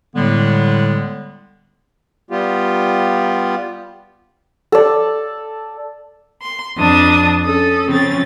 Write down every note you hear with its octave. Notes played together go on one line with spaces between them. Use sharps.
A2 D3 G3 G#3 B3
G3 B3 F4 G4
A4 D5
C6
F2 D4 A5 D#6
C#4 A4 D#6
C#3 F3 C4 C#4 A6